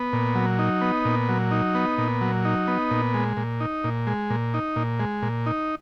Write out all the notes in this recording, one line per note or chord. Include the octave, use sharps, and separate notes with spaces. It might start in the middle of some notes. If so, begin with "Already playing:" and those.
Already playing: B3
A#2
F#3
D#4
B3
A#2
F#3
D#4
B3
A#2
F#3
D#4
B3
A#2
G#3
A#2
D#4
A#2
G#3
A#2
D#4
A#2
G#3
A#2
D#4